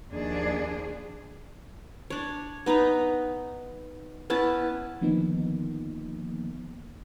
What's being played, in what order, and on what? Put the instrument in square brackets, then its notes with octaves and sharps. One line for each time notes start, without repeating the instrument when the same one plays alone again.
[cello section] D#2 F3 D4 G#4
[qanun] D4 C#5
B3 D#4 B4 A#5
B3 C#4 E4 A5
[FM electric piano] D3 D#3 F3 A#3 B3 D#4